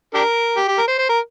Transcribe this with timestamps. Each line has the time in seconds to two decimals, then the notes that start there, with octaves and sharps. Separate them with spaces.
0.14 D4 G4 A#4
0.57 G4
0.68 G4
0.78 A#4
0.88 C5
0.98 C5
1.09 A#4